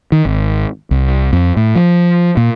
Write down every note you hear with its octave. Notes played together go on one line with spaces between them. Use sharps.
D#3
G#1
C2
F2
A2
F3
A#2